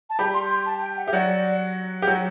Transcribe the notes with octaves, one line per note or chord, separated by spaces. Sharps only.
A5
G3 G4 B5
C6
C6
A5
G5
F#5
G4 E5
F#3 F#4 D5
G4
F#3 F#4